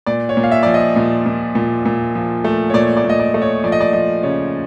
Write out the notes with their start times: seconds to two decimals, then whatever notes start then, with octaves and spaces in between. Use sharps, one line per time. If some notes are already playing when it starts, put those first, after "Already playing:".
0.07 A#2 D5
0.29 C#5
0.37 A#2
0.43 F5
0.52 E5
0.63 F3 D5
0.74 D#5
0.96 A#2
1.26 A#2
1.55 A#2
1.86 A#2
2.15 F3
2.44 A3
2.70 C#5
2.74 A#2 D5
2.97 D5
3.04 A#2
3.10 D#5
3.19 D5
3.34 A3
3.42 C#5
3.64 F3 D5
3.72 D#5
3.81 D5
3.93 F3 D#5
4.23 C#3 C#5